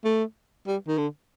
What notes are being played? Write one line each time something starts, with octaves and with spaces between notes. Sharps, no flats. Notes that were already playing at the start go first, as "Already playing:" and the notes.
A3
G3
D#3
D3